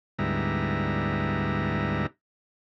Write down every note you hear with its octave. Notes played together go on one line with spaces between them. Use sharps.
D2 G#2 G3 B3 E4 A#5